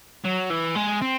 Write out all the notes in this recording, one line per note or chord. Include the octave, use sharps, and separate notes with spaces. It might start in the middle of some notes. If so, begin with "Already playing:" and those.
F#3
E3
G#3
C4